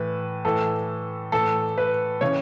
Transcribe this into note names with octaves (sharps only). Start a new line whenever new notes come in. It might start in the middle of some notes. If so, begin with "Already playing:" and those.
Already playing: A2 E3 B4
A2 E3 A4
A2 E3 A4
B4
C#3 E3 C#5